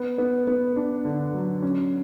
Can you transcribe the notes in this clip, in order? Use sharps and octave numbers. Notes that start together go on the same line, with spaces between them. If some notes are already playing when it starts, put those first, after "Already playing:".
Already playing: B3
B3
B3
D4
D3
F#3
C#4